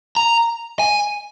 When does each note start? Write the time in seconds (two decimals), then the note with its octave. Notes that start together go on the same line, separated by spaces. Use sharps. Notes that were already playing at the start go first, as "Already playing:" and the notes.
0.17 A#5
0.79 G#5